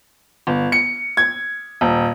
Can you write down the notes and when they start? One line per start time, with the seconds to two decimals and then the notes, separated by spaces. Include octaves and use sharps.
0.47 G1
0.72 C#7
1.17 G#6
1.81 D#1